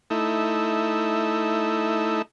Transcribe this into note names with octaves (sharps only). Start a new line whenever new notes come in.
A3 D#4 E4